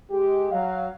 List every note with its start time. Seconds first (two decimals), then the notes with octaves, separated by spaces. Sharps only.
0.11 G#3 G4
0.52 F#3 F5